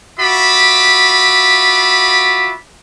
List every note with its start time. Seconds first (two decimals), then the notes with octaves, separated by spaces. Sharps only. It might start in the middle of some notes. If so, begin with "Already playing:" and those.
0.20 F4 F#4 E5 B5 D6